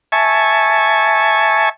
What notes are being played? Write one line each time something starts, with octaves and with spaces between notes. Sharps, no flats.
E5 G#5 A5 C#6